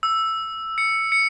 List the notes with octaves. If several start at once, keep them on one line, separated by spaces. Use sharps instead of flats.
E6
C#7
C#7